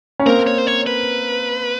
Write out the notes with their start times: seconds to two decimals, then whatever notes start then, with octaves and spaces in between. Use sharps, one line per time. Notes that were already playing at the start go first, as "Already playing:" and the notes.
0.20 C#4
0.26 A#3 C4 A#4
0.47 C#5
0.58 C5
0.67 C#5
0.87 B4